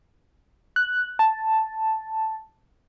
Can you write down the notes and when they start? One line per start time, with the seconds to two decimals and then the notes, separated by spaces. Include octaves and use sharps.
0.76 F#6
1.19 A5